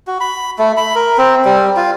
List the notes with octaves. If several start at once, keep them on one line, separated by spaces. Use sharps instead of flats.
F#4
B5
A3
B5
A#4
C4
G3
F4